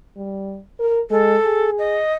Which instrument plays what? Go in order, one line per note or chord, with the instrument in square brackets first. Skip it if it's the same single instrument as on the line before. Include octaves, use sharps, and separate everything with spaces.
[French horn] G3
A#4
[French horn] G#3 [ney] A4
[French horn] G#4
[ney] D#5